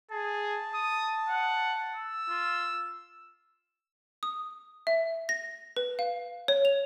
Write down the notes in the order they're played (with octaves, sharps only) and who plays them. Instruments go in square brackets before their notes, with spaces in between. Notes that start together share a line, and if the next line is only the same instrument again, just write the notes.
[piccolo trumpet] G#4 [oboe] A5
[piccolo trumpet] D#6
F#5
E6
[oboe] F4
[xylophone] D#6
E5
A#6
B4
F5
C#5
F7